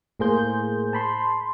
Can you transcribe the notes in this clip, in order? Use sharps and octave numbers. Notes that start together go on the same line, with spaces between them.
A2 A#3 G#4 C5 G6
A5 B5 C6